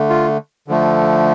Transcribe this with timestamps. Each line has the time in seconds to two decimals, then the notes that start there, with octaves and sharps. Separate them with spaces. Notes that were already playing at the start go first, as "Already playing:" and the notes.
Already playing: D3 A3
0.10 F4
0.68 D3 F3 A3